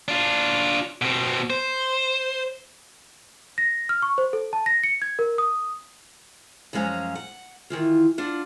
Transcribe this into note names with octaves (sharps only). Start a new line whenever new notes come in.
D4 F4
B2 C4
C5
A#6
F6
C#6
C5
A4
A5
A#6
C#7
G#6
A#4
D#6
F#2 F3 G#3 C#4 F5 A#5
F#5
D#3 E3 F4
D4 F4 F#5